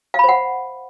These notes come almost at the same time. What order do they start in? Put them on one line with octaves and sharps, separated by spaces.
F5 B5 C5 F#5